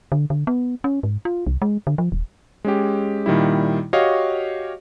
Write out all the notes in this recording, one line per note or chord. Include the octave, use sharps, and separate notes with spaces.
D3
D3
B3
C#4
G#2
F4
C2
G#3
D3
F3
D#1
G#3 C#4 G4
A#2 D#3 G3 E4
F#4 G4 C#5 D#5 F5